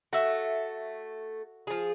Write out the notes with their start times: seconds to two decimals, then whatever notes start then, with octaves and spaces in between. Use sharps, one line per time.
0.13 A3 F#4 E5
1.67 F3 G#4